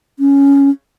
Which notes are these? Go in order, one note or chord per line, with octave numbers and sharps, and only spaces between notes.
C#4